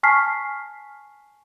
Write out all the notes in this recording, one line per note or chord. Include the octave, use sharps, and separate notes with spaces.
G#5 A5 C#6 F6 B6 C7